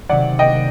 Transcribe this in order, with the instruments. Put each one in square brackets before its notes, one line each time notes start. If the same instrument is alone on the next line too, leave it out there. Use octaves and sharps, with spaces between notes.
[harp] C3 D#3 F#3 [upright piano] D5 F#5
[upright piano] D#5 G5